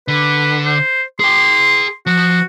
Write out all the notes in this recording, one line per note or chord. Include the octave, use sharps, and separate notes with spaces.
D3 B4
C5
G#4 G5 C6
F3 F#4